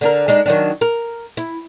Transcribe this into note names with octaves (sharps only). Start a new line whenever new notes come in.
D3 D4 A#4
G#3 D4 D#4
D#3 F#3 D4
A#4
E4